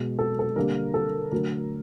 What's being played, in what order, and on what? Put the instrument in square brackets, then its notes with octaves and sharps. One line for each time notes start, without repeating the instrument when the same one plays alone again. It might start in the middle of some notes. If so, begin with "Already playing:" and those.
Already playing: [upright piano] B2 G#3
A4
A4
D3 G3 A#3 A#4
A4
D3 F#3 A3 A#4